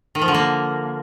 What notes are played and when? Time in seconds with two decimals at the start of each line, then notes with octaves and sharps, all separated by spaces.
0.15 D#3
0.22 F3
0.28 D3
0.34 A#3